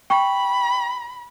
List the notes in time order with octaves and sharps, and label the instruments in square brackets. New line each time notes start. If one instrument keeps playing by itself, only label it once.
[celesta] G5 C#6 [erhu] B5